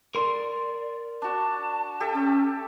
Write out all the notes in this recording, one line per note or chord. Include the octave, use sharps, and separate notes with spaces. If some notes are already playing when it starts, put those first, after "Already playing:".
A#4 D5 C6
D4 F#4 A5
G4 A4 E5
C#4 A4